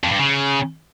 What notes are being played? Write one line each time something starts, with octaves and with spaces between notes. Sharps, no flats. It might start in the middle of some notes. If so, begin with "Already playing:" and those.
F2
G2
C#3